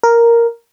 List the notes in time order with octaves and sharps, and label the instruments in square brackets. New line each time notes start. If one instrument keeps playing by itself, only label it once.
[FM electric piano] A#4